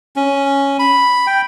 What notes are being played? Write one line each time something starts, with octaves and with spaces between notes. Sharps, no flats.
C#4
B5
G5